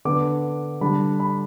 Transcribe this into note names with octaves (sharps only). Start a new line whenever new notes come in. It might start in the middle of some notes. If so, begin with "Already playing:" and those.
D3 B3 D4 D6
D3 G3 D4 B5
B5